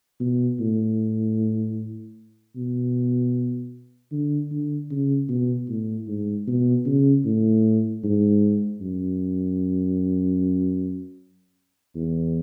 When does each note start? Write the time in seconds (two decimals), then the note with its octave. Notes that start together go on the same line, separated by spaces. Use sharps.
0.20 B2
0.60 A2
2.56 B2
4.12 D3
4.51 D3
4.91 C#3
5.29 B2
5.69 A2
6.08 G#2
6.47 B2
6.86 C#3
7.25 A2
8.04 G#2
8.81 F#2
11.95 E2